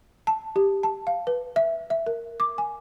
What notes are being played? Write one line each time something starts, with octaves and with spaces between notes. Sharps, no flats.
A5
G4
A5
F5
B4
E5
E5
A#4
D6
G#5